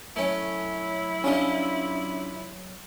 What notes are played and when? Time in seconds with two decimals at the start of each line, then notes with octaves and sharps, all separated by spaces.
0.16 F#3 A3 C#4 E4
1.24 G3 C#4 D4 F4 D#5